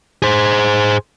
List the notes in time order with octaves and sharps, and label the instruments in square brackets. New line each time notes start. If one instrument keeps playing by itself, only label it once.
[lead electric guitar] G#4 C5